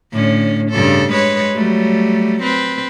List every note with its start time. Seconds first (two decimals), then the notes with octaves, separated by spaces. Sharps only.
0.13 A2 D3 C#4
0.70 G2 C#3 A4
1.11 G#3 B4 C#5
1.54 F#3 G3 A3
2.42 C4 B4